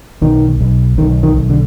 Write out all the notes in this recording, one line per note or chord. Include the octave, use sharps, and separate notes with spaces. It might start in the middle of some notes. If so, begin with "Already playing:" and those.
B1 D#3
B1
B1 D#3
D#3
B1
D3